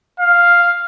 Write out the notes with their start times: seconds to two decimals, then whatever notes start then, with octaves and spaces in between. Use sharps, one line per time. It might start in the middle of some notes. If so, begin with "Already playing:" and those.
0.20 F5